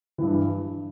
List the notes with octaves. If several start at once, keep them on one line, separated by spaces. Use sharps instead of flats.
G2 E3